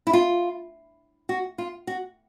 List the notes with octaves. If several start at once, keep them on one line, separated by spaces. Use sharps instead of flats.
E4
F4
F#4
F4
F#4